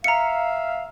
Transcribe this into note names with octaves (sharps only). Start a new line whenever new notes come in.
E5 F5 A#5 C#7